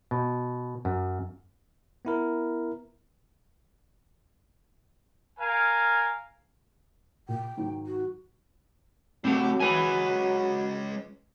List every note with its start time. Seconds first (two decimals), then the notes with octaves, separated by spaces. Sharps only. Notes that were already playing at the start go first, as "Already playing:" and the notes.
0.11 B2
0.85 F#2
2.05 B3 E4 A#4
5.39 A#4 F5 G#5
7.28 A#2 G5
7.57 G#2 D#3 F#3
7.86 F#4
9.25 F#3 A3 C4 G4
9.60 G#3 C#4 B4 G#5